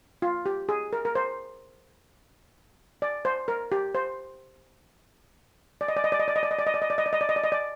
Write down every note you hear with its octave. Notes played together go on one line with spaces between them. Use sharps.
F4
G4
G#4
A#4
A#4
C5
D5
C5
A#4
G4
C5
D5
D#5
D5
D#5
D5
D#5
D5
D#5
D5
D#5
D5
D#5
D5
D#5
D5
D#5
D5
D#5
D5
D#5
D5
D#5
D5